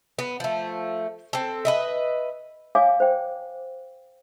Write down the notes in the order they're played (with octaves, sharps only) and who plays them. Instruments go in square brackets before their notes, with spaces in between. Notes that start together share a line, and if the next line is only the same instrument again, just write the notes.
[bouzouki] B3
F3 A3
C4 A4
B4 D#5 E5
[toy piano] C#5 F5 G#5 D6
C5 G5